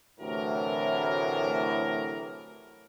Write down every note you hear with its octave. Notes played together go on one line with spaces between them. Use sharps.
D2 A2 C3 E3 F#3 A#4